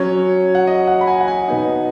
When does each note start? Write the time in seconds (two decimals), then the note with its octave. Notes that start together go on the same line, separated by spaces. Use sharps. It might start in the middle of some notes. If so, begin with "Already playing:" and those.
Already playing: F#3 C#4 C#5
0.55 F#5
0.67 D#5
0.87 F#5
1.01 B5
1.07 G#5
1.21 F#5
1.28 G#5
1.48 B2 B3 D#4